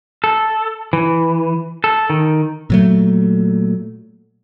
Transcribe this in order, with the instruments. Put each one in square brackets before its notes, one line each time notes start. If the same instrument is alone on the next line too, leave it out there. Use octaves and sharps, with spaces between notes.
[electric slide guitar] A4
E3
A4
D#3
[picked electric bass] A#2 F#3 A3